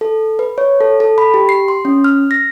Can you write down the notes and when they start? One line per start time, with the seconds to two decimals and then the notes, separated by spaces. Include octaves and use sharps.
0.01 A4
0.39 B4
0.58 C#5
0.81 A4
1.00 A4
1.18 B5
1.34 G4
1.49 C7
1.68 C6
1.85 C#4
2.04 F6
2.31 A#6